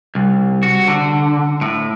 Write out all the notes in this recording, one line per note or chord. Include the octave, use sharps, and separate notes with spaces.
C2
F#4
D3
A2